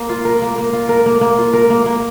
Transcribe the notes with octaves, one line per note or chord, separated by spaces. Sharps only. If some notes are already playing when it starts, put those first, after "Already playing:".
Already playing: A#3
F4
A#4
A#3
A#3
F4
A#4
A#3
A#3
F4
A#4
A#3
A#3